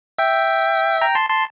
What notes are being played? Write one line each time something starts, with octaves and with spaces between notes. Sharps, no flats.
E5 G5
G5 A#5
A5 C6
A5 C6